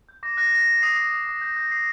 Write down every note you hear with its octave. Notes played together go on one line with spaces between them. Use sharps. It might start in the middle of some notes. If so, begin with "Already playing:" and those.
G6
D6 A#6
F#6 A#6
F#6 A#6
B6
F#6
D#6 C7
D#6
D#6
D#6
G6
G6
D#6 C7